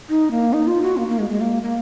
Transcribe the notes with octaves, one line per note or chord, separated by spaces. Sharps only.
D#4
A#3
D#4
F4
F#4
A#3
A#3
G#3
G#3
A#3
A#3